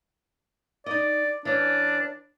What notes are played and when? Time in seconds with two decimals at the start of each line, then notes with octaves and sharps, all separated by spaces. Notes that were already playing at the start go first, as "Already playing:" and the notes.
0.86 D#4 D5 D#5
1.45 E3 C#4 D4